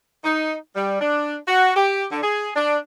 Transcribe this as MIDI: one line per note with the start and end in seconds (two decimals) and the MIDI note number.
0.24 0.56 63
0.76 0.97 55
1.01 1.34 62
1.47 1.71 66
1.76 2.05 67
2.11 2.20 50
2.23 2.50 68
2.55 2.77 62